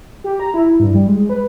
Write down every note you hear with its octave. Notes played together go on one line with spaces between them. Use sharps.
G4
A#5
E4
G2
G3
G#3
B4